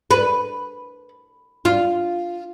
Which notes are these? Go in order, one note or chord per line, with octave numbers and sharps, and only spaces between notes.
B4
F4